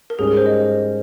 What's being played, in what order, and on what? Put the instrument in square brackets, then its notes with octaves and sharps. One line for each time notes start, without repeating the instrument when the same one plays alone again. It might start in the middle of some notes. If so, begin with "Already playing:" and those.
[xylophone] A#4
[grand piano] G#2 G3 C#4 G4 [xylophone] G#4
[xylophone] A#4
C5
D#5